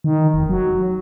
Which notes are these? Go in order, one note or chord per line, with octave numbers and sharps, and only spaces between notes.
D#3
F1
F#3